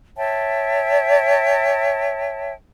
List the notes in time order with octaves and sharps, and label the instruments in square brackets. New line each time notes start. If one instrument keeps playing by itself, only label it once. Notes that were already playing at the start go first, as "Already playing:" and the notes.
[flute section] C#5 E5 G5 A5